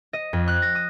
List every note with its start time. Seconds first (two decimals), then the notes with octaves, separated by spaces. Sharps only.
0.13 D#5
0.33 F2
0.48 F#6
0.62 A#6
0.75 D#6